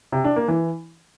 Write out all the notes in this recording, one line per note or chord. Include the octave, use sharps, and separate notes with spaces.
C3
D4
A#3
E3